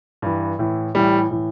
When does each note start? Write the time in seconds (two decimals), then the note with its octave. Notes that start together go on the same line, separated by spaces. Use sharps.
0.22 G2 E3
0.59 A2 E3
0.95 A2 E3 G3
1.31 A2 E3